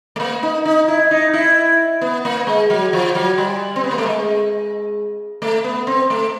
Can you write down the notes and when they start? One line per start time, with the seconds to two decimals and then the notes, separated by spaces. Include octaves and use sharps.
0.16 A3
0.20 A#3
0.43 D#4
0.65 D#4
0.88 E4
1.11 D#4
1.34 E4
2.01 B3
2.25 A#3
2.47 G#3
2.70 F#3
2.93 F3
3.15 F#3
3.38 G3
3.76 C4
3.84 B3
3.91 A#3
3.98 A3
4.06 G#3
5.42 A3
5.64 B3
5.87 C4
6.10 A3